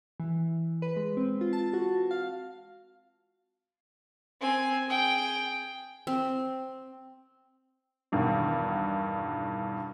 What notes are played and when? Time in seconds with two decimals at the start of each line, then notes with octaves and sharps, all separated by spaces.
0.20 E3
0.82 B4
0.96 G#3
1.17 C4
1.41 F4
1.53 A5
1.73 F#4
2.11 F5
4.41 C4 G#5
4.88 G#4 G5
6.07 C4
8.12 E2 G2 B2 D#3